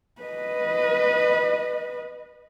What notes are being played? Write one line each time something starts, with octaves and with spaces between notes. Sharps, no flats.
B4 D#5